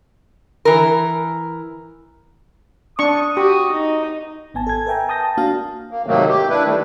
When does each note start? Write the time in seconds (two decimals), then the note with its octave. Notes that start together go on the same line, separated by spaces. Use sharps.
0.65 E3 A#4
2.99 D4 C#6 D#6
3.37 F#4 G4
3.72 D#4
4.54 G#1 B3 G#5 A5
4.67 A4 G#6
4.87 A#4 B4 E5 G5 G#5 A#5
5.09 A5 D#6 G6 A#6
5.20 G5 A5
5.37 A#3 D4 F#4 F5 A5
5.91 A#3
6.06 G#2 C3 D#3 F#3 A3 A#3
6.28 G4
6.49 D4 E4 B4
6.64 D#3 G3 A3